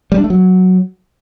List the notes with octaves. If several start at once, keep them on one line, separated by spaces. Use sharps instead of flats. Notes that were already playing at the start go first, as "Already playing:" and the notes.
G3
D4
A3
F#3